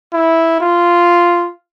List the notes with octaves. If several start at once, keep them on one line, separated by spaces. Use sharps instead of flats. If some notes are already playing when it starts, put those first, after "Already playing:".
E4
F4